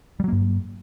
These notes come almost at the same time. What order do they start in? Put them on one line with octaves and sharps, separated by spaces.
G3 F#3 A#3 G2